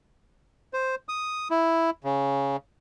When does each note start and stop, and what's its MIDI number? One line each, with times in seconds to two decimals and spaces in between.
0.73 0.95 72
1.09 1.48 87
1.51 1.90 64
2.04 2.57 49